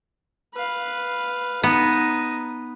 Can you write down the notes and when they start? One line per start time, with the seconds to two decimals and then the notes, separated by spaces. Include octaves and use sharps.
0.54 B4 F5
1.63 B3 D#4 D#5